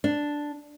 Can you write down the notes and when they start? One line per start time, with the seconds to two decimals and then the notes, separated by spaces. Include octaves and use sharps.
0.04 D4